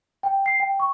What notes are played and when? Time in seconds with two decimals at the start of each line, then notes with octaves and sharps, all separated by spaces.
0.23 G5
0.46 C7
0.60 G5
0.80 C#6